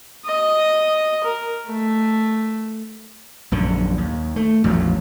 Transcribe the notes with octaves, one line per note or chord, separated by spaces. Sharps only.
D#5
A#4
A3
A#1 F#2 D3
D#2
A3
A1 E2 F3 F#3